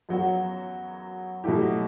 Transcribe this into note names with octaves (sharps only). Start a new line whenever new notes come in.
F#2 F#3 B3 F#4
B2 F#3 A3 E4 G4